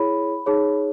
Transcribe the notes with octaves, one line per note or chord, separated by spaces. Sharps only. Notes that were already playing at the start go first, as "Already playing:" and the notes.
Already playing: E4 G#4 C#5 B5
D#4 G#4 C#5